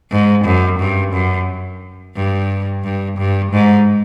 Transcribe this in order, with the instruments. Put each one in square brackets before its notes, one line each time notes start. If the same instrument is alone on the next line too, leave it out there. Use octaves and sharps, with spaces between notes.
[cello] G#2
F#2
G2
F#2
G2
G2
G2
G#2